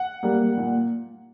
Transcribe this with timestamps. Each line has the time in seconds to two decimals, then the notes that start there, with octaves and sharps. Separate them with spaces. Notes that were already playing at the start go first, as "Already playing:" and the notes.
Already playing: F#5
0.23 G3 A#3
0.58 A#2